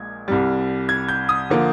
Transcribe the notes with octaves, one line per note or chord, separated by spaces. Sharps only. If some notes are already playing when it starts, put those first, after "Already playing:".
Already playing: A#1 A#2 G#3 G#6
C2 C3 G3
G#6
G6
D#6
D3 F3 A#3